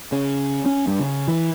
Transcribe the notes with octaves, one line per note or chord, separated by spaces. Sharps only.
C#3
C#4
G2
C#3
E3